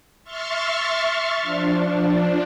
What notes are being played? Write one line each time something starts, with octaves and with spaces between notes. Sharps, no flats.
E5 C6 C#6 F6 A6
F3 D4